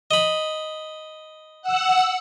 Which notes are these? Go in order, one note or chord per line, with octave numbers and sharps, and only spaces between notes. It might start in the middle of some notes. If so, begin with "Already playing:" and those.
D#5 B5
F#5 E6